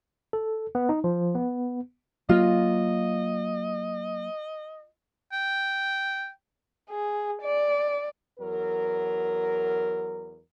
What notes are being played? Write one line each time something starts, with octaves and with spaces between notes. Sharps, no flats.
A4
B3
D#4
F3
B3
F#3 A#3 F4 D#5
G5
G#4
D5
E2 F#3 A#4